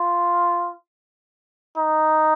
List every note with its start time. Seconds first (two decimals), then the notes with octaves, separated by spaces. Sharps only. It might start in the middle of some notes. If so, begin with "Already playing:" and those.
Already playing: F4
1.77 D#4